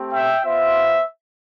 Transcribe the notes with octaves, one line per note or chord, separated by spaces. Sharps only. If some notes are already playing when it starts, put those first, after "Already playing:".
Already playing: A3 C4 G4
E5 G5
B3 F4 C5 E5